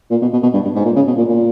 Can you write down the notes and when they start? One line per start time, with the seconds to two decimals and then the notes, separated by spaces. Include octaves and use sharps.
0.11 A#2
0.22 B2
0.33 B2
0.43 B2
0.54 G2
0.65 G2
0.75 G#2
0.85 A#2
0.96 C#3
1.07 B2
1.18 A#2
1.29 A#2